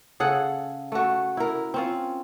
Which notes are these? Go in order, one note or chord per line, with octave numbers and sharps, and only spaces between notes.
C#3 G#4 A4 F#5
A3 F#4
E4 A#4
C4 C#4 F4